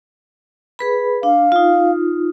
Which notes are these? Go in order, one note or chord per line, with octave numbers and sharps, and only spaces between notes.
G#4 B4 B5
D4 F5
D#4 F4